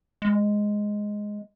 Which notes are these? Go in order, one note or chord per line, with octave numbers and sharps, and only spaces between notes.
G#3